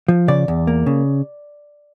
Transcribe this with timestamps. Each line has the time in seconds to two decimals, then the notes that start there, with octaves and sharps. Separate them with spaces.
0.08 F3
0.28 C#3 D5
0.48 E2
0.67 A#3
0.86 C#3